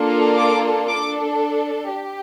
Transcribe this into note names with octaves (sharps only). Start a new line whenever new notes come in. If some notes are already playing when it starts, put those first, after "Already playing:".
Already playing: A#3 D4 F4 A4
D6
D4 A4 D6
G4